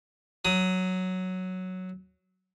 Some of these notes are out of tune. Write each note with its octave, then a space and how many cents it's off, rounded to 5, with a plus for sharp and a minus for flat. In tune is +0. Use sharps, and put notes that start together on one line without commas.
F#3 +0 D#6 +15